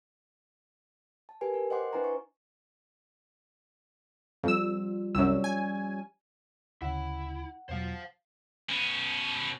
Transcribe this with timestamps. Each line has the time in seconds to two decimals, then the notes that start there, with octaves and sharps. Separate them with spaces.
1.29 A5
1.41 G4 A#4 B4 G#5
1.54 A#4
1.70 C5 D#5 F#5 G5 C6 D6
1.93 D4 E4 B4 C5 G#5 A#5
2.04 C#6
4.44 F2 F3 G3 E6
5.15 C2 F#2 G3 C#4 E6
5.44 G#5
6.82 D2 C#3 E4 F#5
7.69 E2 B2 F#3 C5 F5
8.69 B2 C#4